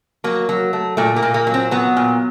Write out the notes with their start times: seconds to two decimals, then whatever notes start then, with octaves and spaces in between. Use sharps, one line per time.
0.24 F#3 A#3
0.49 F#3
0.73 A3
0.97 A#2 A3
1.16 A#3
1.22 A#2
1.34 A#3
1.47 F#3
1.54 C4
1.71 F#3 B3
1.97 A#2